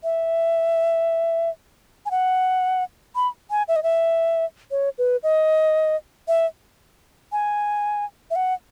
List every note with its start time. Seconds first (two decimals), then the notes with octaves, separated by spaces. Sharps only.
0.04 E5
2.06 G#5
2.11 F#5
3.16 B5
3.51 G#5
3.68 E5
3.76 D#5
3.83 E5
4.71 C#5
4.98 B4
5.23 D#5
6.28 E5
7.32 G#5
8.31 E5
8.36 F#5